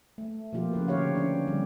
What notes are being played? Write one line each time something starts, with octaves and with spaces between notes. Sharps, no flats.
A3
B2 F3 A#3 F4 G4
C#3 F3 E4 B4
D3 D#4 G4 C#5 F5 F#5
E3 C#4 D4 D5
D3 G3 C4